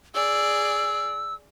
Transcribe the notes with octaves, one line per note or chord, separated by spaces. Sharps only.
G#4 D5 E6